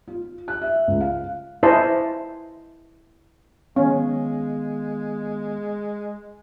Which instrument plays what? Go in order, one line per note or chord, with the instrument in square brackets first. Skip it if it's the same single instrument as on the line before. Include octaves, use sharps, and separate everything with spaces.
[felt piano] F4
F#6
E5
C#2
F5
[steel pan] E4 C5 D#5 G#5 A5
[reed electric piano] D#3 B3 F5 [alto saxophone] G#3 [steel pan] C#4